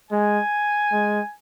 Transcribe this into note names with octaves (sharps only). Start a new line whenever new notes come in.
G#3 G#5
G#3